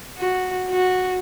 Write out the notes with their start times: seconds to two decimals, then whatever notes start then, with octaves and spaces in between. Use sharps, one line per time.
0.18 F#4
0.70 F#4